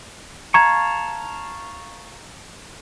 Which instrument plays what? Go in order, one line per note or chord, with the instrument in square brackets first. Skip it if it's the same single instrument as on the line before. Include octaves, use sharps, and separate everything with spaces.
[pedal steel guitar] F5 A5 C#6 [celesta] A#5 G#6